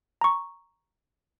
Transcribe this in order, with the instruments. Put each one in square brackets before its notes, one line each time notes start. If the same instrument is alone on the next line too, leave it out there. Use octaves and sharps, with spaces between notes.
[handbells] A#5 C#6